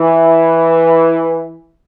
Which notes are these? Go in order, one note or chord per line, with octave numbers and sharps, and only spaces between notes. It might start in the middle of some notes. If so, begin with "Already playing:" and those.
Already playing: E3